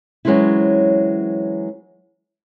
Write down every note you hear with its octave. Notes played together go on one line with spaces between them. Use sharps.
E3 F#3 G#3 C4 C#4 E4